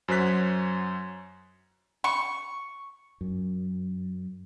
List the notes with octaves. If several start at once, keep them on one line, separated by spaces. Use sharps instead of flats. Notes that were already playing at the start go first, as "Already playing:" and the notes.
F#2 F#3 C5 C#5 F#6 B6
C#6
F#2